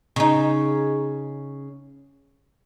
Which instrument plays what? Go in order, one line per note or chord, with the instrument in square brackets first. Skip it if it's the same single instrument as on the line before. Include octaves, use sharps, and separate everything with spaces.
[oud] C#3 D#4